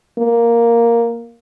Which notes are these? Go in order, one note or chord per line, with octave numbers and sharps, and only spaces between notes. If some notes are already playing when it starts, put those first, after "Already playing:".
A#3